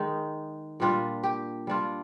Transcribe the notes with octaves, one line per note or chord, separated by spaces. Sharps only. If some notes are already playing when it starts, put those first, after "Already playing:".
Already playing: D#3 G#3 D#4
A#2 G3 D4 F4
G4
G3 D4 F4